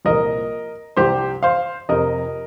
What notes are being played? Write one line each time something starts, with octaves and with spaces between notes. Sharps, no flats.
C2 A#2 F3 A#4 D#5
C2 C3 F3 G4 C5
C5 F5
F2 C3 F3 A#4 D#5